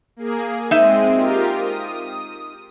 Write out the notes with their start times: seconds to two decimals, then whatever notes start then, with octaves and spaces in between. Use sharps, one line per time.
0.16 A#3 G#4
0.71 G#3 C4 D#4 E5 D#7
1.15 F4 G4 A#4
1.54 D#6